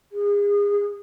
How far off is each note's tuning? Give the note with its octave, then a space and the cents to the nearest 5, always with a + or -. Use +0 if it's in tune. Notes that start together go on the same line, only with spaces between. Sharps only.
G#4 -35